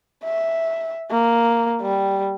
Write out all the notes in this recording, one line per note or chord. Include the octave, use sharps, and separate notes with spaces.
E5
A#3
G3